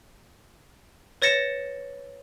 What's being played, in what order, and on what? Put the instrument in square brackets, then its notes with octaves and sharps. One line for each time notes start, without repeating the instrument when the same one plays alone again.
[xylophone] B4 C#5 A6 A#6 C#7 E7